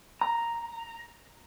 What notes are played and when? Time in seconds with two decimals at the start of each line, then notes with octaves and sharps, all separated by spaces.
0.21 A#5